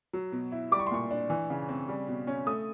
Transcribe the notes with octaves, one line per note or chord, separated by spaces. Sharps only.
F#3
B2
E4
G3 D6
C#6
C6
A#2 C#6
D4
E3
C#3
C4
G3
B2
C#4
A3 D#6